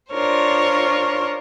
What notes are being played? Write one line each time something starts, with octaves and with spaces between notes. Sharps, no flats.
D4 F4 A#4 C5 C#5